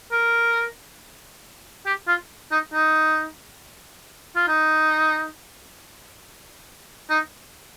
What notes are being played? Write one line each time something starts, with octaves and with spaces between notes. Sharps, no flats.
A#4
G4
F4
D#4
D#4
F4
D#4
D#4